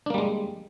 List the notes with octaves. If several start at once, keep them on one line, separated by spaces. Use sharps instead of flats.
G3 G#3 A#3 D4